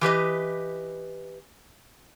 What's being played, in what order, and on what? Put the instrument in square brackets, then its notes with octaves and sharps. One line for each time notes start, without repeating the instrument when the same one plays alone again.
[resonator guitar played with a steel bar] E3 G4 B4 D#5